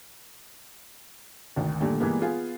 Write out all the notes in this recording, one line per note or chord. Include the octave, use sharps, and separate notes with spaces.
G#1 D2 D#3
A#2 D3 D#3 G3 A3
A#2 E3 G3 G#3 A#3 B3
B3 F4 G#4